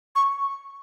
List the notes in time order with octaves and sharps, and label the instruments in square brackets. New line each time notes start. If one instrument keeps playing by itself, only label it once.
[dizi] C#6